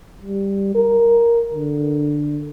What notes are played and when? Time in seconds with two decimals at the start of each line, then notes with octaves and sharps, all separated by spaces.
0.22 G3
0.75 A#4
1.54 D3